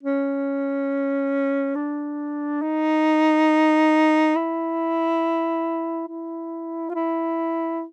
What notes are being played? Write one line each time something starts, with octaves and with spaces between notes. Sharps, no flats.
C#4
D4
D#4
E4
E4
F4
E4